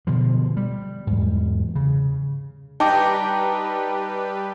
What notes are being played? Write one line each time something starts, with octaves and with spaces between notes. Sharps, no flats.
B2 D3 F3
G3
E2 G#2
C#3
G3 D#4 G4 B4 G5 A5 A#5 D6